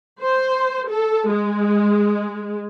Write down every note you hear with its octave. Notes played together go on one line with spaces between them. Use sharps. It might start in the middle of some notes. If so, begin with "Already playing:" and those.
C5
A4
G#3